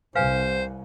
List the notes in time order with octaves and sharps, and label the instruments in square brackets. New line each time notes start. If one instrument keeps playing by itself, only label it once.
[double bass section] C2 [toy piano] B4 F5 G#5 [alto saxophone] C5